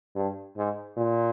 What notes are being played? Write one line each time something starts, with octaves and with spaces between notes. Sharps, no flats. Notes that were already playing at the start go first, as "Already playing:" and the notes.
G2
G#2
A#2